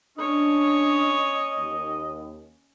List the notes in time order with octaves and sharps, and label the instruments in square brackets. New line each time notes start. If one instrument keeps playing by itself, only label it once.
[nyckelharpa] C#4 C#5 [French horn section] D4 [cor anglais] D#5
[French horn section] D#2